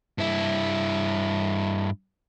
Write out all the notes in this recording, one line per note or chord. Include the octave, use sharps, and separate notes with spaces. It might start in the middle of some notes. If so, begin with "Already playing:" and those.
G2 E4